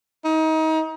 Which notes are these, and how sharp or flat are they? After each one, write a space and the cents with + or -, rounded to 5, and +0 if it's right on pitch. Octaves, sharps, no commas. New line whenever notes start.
D#4 +30